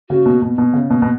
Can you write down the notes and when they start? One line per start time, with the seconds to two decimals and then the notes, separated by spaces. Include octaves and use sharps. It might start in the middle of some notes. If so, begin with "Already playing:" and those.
0.09 C#3 F#4
0.26 B2
0.42 B2
0.58 B2
0.73 C#3
0.90 B2
1.02 B2